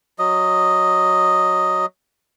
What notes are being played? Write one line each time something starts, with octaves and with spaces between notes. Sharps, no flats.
F#3 D#5